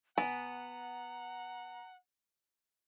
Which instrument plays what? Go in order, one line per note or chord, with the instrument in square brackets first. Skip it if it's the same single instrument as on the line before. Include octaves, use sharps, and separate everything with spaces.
[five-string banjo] B3 [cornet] F#5 [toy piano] G#5 [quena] A#5